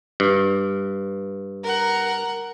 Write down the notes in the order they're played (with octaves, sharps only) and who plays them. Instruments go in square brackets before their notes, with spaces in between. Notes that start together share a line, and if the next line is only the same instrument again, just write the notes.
[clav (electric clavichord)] G2
[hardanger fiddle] A#4 F#5